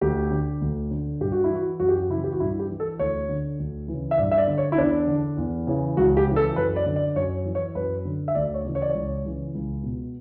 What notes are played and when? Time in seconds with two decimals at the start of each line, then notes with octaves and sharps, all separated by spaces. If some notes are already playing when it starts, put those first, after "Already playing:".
0.01 D2 G4
0.31 D3
0.61 D2
0.91 D3
1.20 G2 G4
1.32 F#4
1.44 E4
1.51 E3 F#4
1.80 F#2 F#4
1.89 G4
1.98 F#4
2.10 C#3 E3 E4
2.24 G4
2.32 F#4
2.40 G2 E4
2.59 G4
2.69 E3
2.80 A4
2.99 D2 C#5
3.29 D3
3.59 D2
3.88 C#3 E3
4.11 E5
4.18 G2 D5
4.31 E5
4.38 D5
4.48 D3
4.58 C#5
4.72 E4
4.78 E2 D4
5.07 D3
5.37 E2
5.67 C#3 E3
5.97 C#2 F#4
6.17 G4
6.27 C#3 E3
6.36 A4
6.56 F#2 B4
6.76 D5
6.86 D3
6.96 D5
7.16 F#2 C#5
7.45 E3
7.55 C#5
7.75 F#2 B4
8.05 D3
8.28 E5
8.35 D2 D5
8.54 C#5
8.65 C#3 E3
8.75 C#5
8.82 D5
8.90 C#2 C#5
9.25 C#3 E3
9.54 C#2
9.83 B2